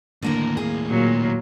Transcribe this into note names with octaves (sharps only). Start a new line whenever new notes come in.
D#2 A2 D3 A#3 A#4
A#3 G#4
A#2 F#3 A#3